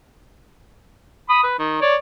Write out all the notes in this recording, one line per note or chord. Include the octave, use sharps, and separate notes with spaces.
B5 D#6
B4
D#3
C#5 D5